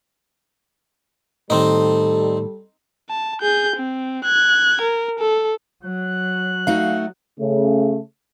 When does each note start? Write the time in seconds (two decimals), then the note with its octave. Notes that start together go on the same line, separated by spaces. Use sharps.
1.50 A2 D#3 G3 C4 D#4 A4
3.09 A5
3.41 G#4 G6
3.76 C4
4.24 F#6 G#6
4.82 A#4
5.19 A4
5.84 F#3 F#6
6.67 A3 D#4 F#4 F5
7.40 C#3 A3